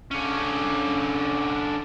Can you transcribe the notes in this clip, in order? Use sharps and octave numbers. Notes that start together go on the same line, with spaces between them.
D3 C#4